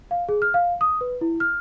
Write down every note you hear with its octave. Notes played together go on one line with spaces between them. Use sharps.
F5
G#4
F6
F5
D#6
B4
E4
F6